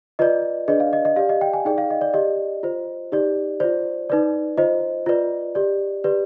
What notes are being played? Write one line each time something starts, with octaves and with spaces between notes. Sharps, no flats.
F4 B4 D5 D#5
D4 G#4 B4 D5 D#5
F5
D#5
D#5
G4 D5 F5
D#5
G5
G#5
D#4 G#4 D5 G5
F5
D#5
D5
G4 D5 D#5
F4 C5
D#4 G4 D5
F4 C5 D5
D#4 B4 D5
F4 C5 D#5
F4 B4 D5
G4 D5
G4 B4 D5